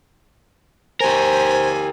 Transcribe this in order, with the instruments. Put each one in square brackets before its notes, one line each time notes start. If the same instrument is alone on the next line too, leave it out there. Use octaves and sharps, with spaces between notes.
[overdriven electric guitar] G4 A#4 [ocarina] C5 [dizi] G#5